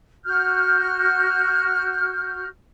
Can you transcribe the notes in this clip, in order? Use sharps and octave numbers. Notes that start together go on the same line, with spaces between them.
F#4 F6 G6